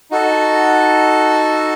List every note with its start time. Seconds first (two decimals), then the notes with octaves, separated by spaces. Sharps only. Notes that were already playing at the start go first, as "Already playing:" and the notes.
0.11 D#4 F#4 A4